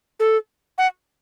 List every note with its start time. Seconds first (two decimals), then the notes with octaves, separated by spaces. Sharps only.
0.19 A4
0.78 F#5